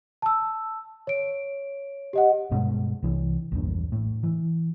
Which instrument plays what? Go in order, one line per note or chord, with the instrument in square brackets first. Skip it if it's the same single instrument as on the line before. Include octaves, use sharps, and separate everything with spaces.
[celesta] A5 E6
C#5 D7
G4 D#5 F#5
[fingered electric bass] G2 B2 G#3
C2 E3
A#1 E2 G2
A2
E3